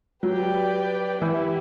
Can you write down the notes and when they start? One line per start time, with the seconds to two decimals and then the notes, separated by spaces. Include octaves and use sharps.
0.23 F#3 G4 B4 D5 G5
1.22 E3 B3 E4 G4